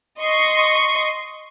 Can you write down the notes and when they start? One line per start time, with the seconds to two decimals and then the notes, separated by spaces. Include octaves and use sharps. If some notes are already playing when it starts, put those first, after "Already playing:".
0.21 D#5 C6 C#6